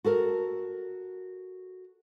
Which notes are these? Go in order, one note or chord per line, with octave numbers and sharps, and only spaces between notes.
F#4 A4 A#4